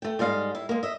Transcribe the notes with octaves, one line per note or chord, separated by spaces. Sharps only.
A3 G5
G#2 G3 D#5 F5
E4
G#3 A#3
D#5 E5